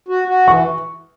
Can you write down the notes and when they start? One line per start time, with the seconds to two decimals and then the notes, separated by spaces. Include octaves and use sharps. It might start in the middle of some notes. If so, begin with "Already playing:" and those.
0.08 F#4
0.28 F#4
0.48 E3 C#6